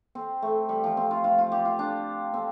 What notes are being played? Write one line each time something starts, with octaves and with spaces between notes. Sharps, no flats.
C4
A3
G3
F3
C4
F4
F4
F4
G4
F4
D4
C4